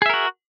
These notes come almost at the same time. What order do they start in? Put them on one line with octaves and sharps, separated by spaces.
G#4 E5 A#4 F#4